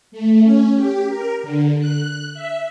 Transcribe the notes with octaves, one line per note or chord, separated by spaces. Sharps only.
A3
C#4
G4
A#4
D3
F#6
E5